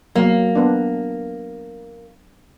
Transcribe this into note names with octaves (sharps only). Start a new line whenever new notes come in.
F#3 A#3
B3 D4